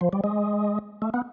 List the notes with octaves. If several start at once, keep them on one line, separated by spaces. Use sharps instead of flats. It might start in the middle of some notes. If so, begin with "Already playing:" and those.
F3
G3
G#3
A3
B3